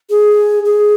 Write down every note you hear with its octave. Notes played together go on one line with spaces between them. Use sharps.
G#4
G#4